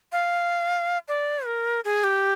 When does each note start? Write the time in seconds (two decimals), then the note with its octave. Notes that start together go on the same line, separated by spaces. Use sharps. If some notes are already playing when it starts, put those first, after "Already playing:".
0.12 F5
1.08 D5
1.46 A#4
1.85 G#4
2.04 G4